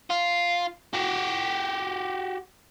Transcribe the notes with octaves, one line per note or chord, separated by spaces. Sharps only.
F4
F#4 G4